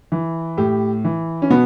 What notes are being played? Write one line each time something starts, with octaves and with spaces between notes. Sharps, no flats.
E3
A2 G4
E3
C#4
B2 B3